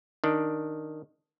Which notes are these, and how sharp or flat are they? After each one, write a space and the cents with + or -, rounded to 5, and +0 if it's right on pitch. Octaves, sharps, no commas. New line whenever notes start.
D#3 -5 D4 +0